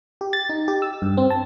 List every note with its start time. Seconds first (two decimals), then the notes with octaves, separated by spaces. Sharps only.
0.21 G4
0.33 A6
0.49 D#4
0.68 G4
0.82 E6
1.02 G2
1.17 C4
1.30 A5